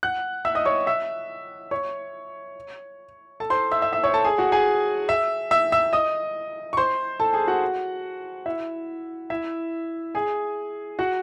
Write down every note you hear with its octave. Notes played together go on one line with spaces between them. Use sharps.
F#5 F#6
E5 E6
D#5 D#6
C#5 C#6
E5 E6
C#5 C#6
A4 A5
C5 C6
E5 E6
E5 E6
E5 E6
C#5 C#6
A4 A5
G#4 G#5
F#4 F#5
G#4 G#5
E5 E6
E5 E6
E5 E6
D#5 D#6
C#6
C5 C6
A4 A5
G#4 G#5
F#4 F#5
E4 E5
E4 E5
G#4 G#5
F#4 F#5